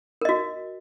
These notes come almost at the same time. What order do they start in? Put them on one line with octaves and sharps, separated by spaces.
A#4 D#5 F#4